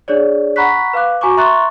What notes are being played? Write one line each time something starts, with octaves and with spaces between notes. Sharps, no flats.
D4 G#4 C#5 D5
F#5 A#5 B5 C#6 F#6 B6
B4 F5 D6 F#6
F#4 G#5 A#5 C#6 D6
E5 A#5 C6 C#6 F#6 A6